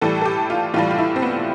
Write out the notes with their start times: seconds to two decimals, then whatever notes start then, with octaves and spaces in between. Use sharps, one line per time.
0.01 A2 E3 G3 A4
0.21 A4
0.25 G4
0.50 F4
0.74 A2 E3 G3 F4
0.91 F4
0.98 E4
1.16 C4
1.22 B3